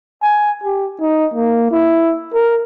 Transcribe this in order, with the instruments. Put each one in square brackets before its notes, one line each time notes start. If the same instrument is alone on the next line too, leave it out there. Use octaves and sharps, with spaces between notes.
[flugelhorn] G#5
G4
D#4
A#3
E4
A#4